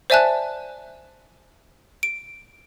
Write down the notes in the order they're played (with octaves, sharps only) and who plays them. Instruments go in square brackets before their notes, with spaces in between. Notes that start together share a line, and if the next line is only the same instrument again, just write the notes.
[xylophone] C5 D5 E5 G#5 A5 F#6
D7